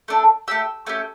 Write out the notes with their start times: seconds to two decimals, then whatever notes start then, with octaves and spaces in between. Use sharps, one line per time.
0.08 A3 D4 A4
0.48 A3 C#4 G4 E6
0.86 A3 C#4 G4